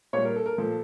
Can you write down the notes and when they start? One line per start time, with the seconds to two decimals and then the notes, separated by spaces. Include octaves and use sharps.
0.13 A#2 C#5
0.16 G3
0.25 A#4
0.36 A4
0.46 A#4
0.58 A#2 F3 A4